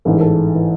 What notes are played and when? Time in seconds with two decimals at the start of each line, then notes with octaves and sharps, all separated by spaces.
0.05 A1 G#2 E3 A4
0.13 G#4
0.21 A4
0.55 E3